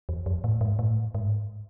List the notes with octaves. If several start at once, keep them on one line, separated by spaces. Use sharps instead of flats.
E2
F2
A2
G#2
A2
G#2